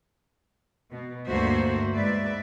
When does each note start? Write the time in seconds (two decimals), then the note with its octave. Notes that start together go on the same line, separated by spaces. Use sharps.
0.91 B2
1.28 D2 G2 A#3 F#4 C5 E5
1.93 G#2 B4 D5 E5